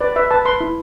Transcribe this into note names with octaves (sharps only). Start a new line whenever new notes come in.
B4 D5
B4 E5
B4 A5
B4 C6
E4